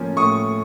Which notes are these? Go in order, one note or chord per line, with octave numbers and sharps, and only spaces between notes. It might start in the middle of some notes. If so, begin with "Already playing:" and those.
Already playing: A2 F3 A#3 C#4
A2 C#6 D#6